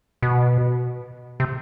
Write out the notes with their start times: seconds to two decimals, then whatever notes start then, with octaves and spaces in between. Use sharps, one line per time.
0.22 B2
1.40 C3